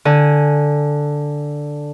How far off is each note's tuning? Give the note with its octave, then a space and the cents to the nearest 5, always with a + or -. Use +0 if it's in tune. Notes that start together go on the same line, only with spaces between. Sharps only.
D3 +0 G#5 +0